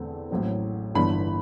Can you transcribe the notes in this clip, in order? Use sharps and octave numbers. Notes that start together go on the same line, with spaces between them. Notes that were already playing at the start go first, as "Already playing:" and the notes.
Already playing: E2 D3 A3 C4
A1 A2 F#3 C4
G1 G2 E3 B3 D4 B5